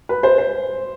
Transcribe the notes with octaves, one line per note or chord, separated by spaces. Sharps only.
B4
C5
C5